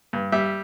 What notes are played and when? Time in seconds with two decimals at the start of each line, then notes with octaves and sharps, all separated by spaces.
0.13 G2
0.32 G3 E5